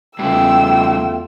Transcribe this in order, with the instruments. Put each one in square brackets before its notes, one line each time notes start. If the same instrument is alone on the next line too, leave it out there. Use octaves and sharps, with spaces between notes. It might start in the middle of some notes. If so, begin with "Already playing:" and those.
[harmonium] E2 A3 F4 [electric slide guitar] G2 C#3 [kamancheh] G5 E6